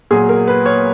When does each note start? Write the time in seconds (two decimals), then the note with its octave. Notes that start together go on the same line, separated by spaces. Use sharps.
0.11 A#2 F#3 G#4
0.29 A#4
0.48 B4
0.66 C#5